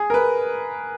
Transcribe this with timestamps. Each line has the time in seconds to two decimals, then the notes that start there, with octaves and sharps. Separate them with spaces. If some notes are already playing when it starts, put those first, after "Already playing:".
Already playing: G#4
0.10 A#4
0.14 B4